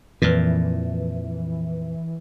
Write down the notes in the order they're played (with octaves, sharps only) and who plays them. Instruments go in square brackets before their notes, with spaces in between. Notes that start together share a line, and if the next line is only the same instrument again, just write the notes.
[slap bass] F2 A#2 [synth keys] E3